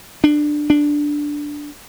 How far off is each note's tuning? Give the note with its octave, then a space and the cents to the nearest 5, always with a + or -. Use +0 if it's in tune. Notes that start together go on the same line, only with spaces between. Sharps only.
D4 +15
D4 +0